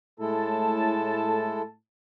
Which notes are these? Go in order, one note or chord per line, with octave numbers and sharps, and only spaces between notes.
A2 G#3 E4 A4 A5